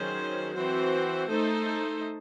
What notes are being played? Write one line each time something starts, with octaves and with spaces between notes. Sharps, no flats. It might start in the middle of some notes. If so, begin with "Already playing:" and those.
Already playing: D#3 F#3 C#4 G#4 C5
E3 C4 F#4 C5
A3 D#4 A4 C5